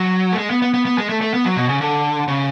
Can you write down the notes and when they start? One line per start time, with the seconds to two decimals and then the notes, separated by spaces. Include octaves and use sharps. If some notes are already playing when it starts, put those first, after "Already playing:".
Already playing: F#3
0.33 A3
0.38 G#3
0.50 B3
0.62 B3
0.74 B3
0.85 B3
0.98 G#3
1.09 A3
1.21 A3
1.34 B3
1.45 F#3
1.57 B2
1.69 C#3
1.81 D3
2.28 C#3